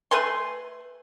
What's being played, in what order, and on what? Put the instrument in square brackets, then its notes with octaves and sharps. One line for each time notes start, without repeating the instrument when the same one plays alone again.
[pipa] A3 B4 G#5 C6